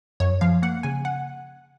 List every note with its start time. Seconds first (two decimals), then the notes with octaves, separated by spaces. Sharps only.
0.20 F#2 C#5
0.41 F3 F5
0.62 A#3 F#5
0.83 C#3 G#5
1.05 F#5